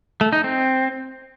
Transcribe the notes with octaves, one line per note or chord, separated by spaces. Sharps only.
A3
D#4
C4